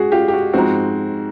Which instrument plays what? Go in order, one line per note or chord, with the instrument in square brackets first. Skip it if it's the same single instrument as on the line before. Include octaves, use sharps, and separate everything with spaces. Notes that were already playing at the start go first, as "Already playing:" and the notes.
Already playing: [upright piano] G#3 F#4 G#4
F4 G4
G4
F#4
G#2 F3 G#3 C4 F#4